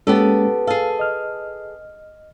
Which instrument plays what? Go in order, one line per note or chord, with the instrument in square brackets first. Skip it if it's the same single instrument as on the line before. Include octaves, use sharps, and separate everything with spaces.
[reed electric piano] G#3 A#3 C#4 [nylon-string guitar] B3 G4 A4
[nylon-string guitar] G#4 A4 [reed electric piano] F5
[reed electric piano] D#5 F6